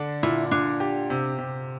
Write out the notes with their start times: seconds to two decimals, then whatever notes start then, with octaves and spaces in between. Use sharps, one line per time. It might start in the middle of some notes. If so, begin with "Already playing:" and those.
Already playing: D3 D4
0.23 A#2 E4
0.51 A#2 D4
0.80 G4
1.10 C3
1.38 C3